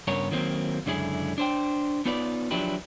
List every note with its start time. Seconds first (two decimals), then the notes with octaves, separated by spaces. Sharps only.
0.08 G2 C#3 B3 A#4 C#5
0.31 D#3 F#3 A#3 C4
0.86 C#2 F#2 D3 E4 G#4
1.38 D4 C5 G5
2.05 B3 D#4 F4 B4 D5
2.51 F3 F#3 D4 E4 G4 B4